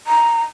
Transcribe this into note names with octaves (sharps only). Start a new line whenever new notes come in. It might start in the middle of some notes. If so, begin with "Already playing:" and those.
A#5